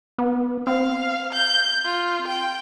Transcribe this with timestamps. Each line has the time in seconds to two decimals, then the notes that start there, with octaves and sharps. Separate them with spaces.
0.18 B3
0.67 C4 F5
1.33 G6
1.85 F4
2.28 G5